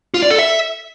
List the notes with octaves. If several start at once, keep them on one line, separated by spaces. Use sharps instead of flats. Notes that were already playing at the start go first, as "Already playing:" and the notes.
F4
D5
A4
E5